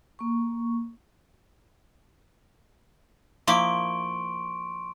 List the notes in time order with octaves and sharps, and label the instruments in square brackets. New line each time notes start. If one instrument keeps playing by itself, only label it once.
[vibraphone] A#3 C#6
[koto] F3 A#3 E4 [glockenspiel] C6 C#6 D7